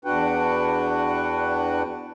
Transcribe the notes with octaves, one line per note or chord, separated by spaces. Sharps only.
E2 D4 F#4 B4 F#5 G5